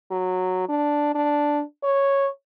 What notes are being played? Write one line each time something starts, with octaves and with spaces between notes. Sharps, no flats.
F#3
D4
D4
C#5